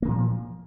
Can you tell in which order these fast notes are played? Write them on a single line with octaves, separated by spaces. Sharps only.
A#3 D#3 A#2 F3